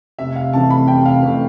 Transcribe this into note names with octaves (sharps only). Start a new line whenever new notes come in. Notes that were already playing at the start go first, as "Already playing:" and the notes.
F1 E5
F5
F2 C3 E3 A3 A5
B5
F1 G5
F5
F2 C3 E3 A3